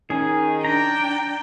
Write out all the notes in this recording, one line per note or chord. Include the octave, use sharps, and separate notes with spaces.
D#3 C#4 G#4
D4 G5 A#5